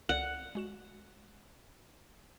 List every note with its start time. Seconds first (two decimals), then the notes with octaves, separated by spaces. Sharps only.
0.09 C#2 A4 D5 F#5
0.55 G#3 F#4 E7